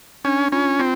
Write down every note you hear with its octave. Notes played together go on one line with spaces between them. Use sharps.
C#4 D4
C#4 F4
C4 F4